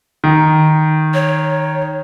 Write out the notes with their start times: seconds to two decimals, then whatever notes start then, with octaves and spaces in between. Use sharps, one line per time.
0.24 D#3
1.14 C#5